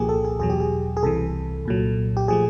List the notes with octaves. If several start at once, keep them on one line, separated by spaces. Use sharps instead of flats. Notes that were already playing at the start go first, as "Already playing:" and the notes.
Already playing: C2 A#2 F3 A#3 G4 G#4
A4
G#4
E2 B2 F#3 G#4
G4
G#4
G#4
C2 C3 E3 A4
C2 A#2 F#3
G4
A#2 F3 A3 G#4